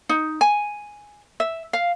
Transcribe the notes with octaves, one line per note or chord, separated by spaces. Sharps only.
D#4
G#5
E5
F5